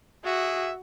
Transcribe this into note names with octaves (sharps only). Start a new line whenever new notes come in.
F#4 G#4 E5